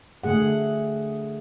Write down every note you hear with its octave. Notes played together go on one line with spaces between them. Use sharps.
D3 A3 G#4 F#5